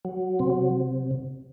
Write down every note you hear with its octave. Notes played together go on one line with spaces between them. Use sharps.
F#3
C3 C4